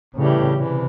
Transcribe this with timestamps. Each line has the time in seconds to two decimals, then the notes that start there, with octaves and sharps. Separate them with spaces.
0.15 A2 C#3 E3 G3
0.56 C3 E3